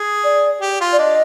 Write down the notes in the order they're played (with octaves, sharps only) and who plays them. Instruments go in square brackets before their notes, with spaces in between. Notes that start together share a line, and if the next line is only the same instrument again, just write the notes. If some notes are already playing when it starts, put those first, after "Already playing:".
Already playing: [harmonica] G#4
[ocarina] D5
[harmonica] G4
F4
[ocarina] D5
[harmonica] D4 [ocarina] D#5